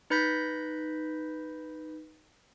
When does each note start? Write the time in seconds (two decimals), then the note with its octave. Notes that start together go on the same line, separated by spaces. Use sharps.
0.10 D#4 B4 B5 G6 A#6 B6